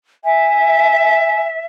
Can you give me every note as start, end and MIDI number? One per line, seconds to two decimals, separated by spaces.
0.24 1.65 76
0.24 1.44 80